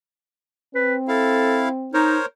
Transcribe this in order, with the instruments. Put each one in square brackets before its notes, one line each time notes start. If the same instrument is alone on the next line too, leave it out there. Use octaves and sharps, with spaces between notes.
[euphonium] C4 [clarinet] B4
[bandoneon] E4 F5 [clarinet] A4
[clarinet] D#4 [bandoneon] A#4 C5 C#5